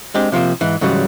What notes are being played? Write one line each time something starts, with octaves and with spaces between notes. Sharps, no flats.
G#3 C4 D4 G4
C3 F3 A#3 C4
G#2 E3
G#2 C#3 E3 F#3 G3